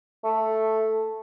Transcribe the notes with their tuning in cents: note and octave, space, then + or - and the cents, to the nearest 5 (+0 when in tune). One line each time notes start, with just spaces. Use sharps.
A3 +0